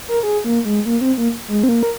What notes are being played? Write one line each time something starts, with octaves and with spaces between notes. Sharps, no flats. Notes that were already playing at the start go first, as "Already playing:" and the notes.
A#4
G#4
A#3
G#3
A#3
C4
A#3
G#3
C4
A#3
A#4